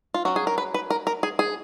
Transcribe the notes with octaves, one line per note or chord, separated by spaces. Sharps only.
F4
F#3 C#4 F#4
G#4
A#4
B4
B4
A#4
A#4
G#4
G#4